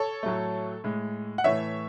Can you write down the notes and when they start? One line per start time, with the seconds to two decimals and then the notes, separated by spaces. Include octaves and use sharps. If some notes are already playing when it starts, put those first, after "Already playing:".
Already playing: A4 C#5
0.23 A2 F#3 A3
0.84 A2 G#3
1.38 F#5
1.44 A2 E3 A3 C#5 E5